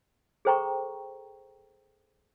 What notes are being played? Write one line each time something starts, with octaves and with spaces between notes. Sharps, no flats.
G#4 A4 C5 G5 A#5 C#6